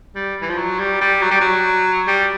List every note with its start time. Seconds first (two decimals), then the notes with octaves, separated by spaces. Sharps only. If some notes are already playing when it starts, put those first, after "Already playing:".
0.16 G3
0.42 E3
0.50 F3
0.58 F#3
0.79 G3
1.01 G3
1.22 F#3
1.31 G3
1.41 F#3
2.07 G3